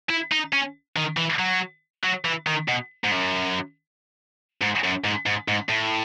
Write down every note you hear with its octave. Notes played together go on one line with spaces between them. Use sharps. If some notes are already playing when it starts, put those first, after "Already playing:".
E4
D#4
C#4
D#3
E3
F#3
F#3
E3
D#3
B2
G#2
F#2
G#2
F#2
G#2
G#2
G#2
A2